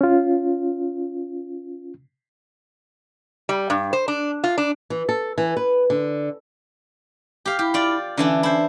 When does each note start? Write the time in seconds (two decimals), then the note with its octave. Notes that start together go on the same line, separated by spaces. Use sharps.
0.01 C#4 F4
3.49 G3
3.70 G2
3.93 C5
4.08 D4
4.44 F4
4.58 D4
4.90 E3
5.09 A4
5.38 E3
5.57 B4
5.90 D3
7.45 G4 F5
7.59 E4 G4
7.74 F4 D5
8.17 D3 E3 C#4 D4
8.43 E4 C5